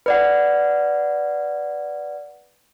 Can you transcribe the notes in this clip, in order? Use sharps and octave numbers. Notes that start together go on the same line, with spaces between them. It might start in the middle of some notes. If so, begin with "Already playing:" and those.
B4 D5 F#5